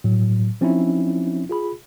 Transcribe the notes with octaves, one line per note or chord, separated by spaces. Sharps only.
A2 F#3
F3 C4 C#4 D#4 E4
F4 G#4 B5